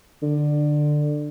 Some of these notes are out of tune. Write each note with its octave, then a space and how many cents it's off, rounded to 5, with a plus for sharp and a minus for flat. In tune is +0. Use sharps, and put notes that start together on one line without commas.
D3 +15